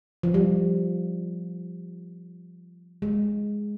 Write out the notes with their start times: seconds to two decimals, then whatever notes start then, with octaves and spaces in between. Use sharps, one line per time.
0.23 F3
0.34 G3
3.02 G#3